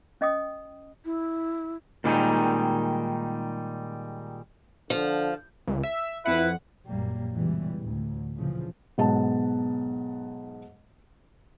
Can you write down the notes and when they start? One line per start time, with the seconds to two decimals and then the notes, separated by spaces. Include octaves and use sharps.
0.21 C#4 D#5 G5 D#6
1.05 E4
2.04 A#2 D#3 G3 G#3 C#4 D#4
4.90 D3 F3
5.67 C#2
5.83 E5
6.26 F2 E4 B4 F#5
6.86 A#1 F#2 G3 A#3
7.33 C#2 B2 E3 G3
7.80 D2 A2
8.34 F2 A#2 C#3 E3 F3
8.98 B1 G#2 B3 A5